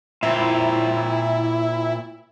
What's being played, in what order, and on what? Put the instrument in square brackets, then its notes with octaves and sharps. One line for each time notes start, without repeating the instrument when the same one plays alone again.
[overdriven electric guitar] A#2 C4 [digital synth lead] E4